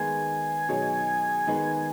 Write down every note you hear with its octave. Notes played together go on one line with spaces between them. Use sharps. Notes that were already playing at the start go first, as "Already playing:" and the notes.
Already playing: D#3 G#3 B3 G#5
B2 F#3 D#4 G#4 C#5
D#3 G#3 B3 D#4 G#4